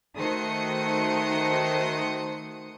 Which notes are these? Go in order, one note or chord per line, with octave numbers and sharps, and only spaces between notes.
D#3 A3 F#4 C5 D#6 C#7